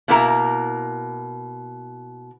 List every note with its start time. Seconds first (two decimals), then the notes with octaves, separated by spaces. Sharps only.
0.08 B2 A#3 E4 A#4 F#5 A#5